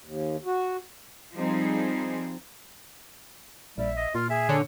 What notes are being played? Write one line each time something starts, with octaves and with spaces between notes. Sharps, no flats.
D#2
F#4
F3 G3 C4 D#4 G#4
A#1 G3 E5
D#5
A#2 F4 F6
G#4 E5
D3 C#5